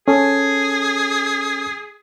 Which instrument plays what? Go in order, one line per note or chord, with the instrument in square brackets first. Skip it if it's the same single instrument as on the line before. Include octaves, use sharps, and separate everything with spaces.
[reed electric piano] C#4 A4 [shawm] G#4